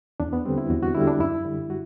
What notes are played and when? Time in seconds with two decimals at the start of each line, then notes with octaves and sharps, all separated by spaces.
0.20 E2 D4
0.33 B3
0.45 D3 G3 C4
0.58 E4
0.70 E2 F#4
0.83 F#4
0.95 D3 G3 E4
1.08 D4
1.20 F#2 E4
1.45 D3 G3
1.70 F#4